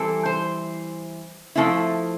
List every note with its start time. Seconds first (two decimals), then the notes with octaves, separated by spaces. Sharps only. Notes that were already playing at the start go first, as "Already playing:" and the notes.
Already playing: E3 G3 C4 E4 A4
0.26 C5
1.55 F3 A3 C4 E4